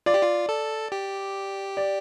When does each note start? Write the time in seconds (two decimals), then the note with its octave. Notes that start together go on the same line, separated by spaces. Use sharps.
0.06 F4 D5
0.14 G4
0.22 F4
0.49 A4
0.92 G4
1.77 D5